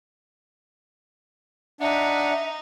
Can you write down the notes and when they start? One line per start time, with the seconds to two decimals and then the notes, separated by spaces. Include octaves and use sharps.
1.81 D4 D#4 E5 F#5